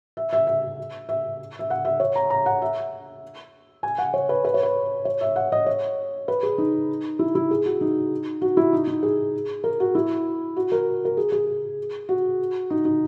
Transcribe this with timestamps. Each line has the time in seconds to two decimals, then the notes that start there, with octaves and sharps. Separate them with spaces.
0.17 E5
0.33 E5
0.47 E5
1.09 E5
1.59 E5
1.70 F#5
1.85 E5
2.00 C#5
2.16 A#5
2.30 A#5
2.46 F#5
2.62 E5
3.83 G#5
3.98 F#5
4.14 C#5
4.29 B4
4.45 B4
4.54 C#5
4.63 B4
5.05 C#5
5.21 E5
5.36 F#5
5.52 D#5
5.66 C#5
6.28 B4
6.43 G#4
6.58 D#4
7.19 E4
7.35 E4
7.51 G#4
7.66 F#4
7.81 D#4
8.42 F#4
8.57 E4
8.73 D#4
8.87 D#4
9.03 G#4
9.64 A#4
9.80 F#4
9.95 E4
10.56 F#4
10.72 A#4
11.05 A#4
11.17 G#4
11.32 G#4
12.09 F#4
12.70 D#4
12.85 D#4